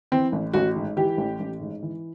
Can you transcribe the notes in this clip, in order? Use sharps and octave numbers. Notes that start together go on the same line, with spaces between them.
E3 C4
A1
A1 F#4
G#2
E3 G4
A1
A1
G#2
E3